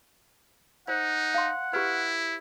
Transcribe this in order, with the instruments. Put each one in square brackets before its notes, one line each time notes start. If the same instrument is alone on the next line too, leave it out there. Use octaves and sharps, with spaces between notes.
[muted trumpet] D#4 [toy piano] C5 [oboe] F#5
[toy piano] F5 C6
[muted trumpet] E4 [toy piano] G4 B4